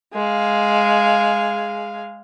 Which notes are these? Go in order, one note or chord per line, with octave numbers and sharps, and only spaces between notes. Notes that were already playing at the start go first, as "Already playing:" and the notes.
G#3 F5